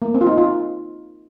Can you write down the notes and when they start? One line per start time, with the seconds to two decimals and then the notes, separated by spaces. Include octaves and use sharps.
0.02 A#3
0.14 C4
0.21 F4
0.27 D#4
0.38 F4